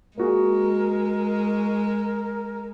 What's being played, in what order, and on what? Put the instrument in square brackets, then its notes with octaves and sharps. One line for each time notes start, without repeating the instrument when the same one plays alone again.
[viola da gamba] G#3 [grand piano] A#3 F#4 G#4 [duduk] A#4